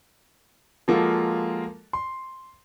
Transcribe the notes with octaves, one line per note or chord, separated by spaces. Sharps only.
F3 G#3 A#3 F4 F#4 A4
C6